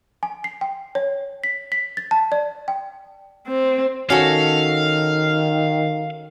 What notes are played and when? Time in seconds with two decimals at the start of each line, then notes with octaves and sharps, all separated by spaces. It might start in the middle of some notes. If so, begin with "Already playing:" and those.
0.23 G#5
0.44 C7
0.61 G5
0.95 C#5
1.44 B6
1.72 B6
1.97 A6
2.11 A5
2.32 D5
2.68 G5
3.47 C4
4.10 D#3 C#4 F#4 A4 F5